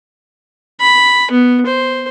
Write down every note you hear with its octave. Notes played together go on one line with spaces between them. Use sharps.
B5
B3
C5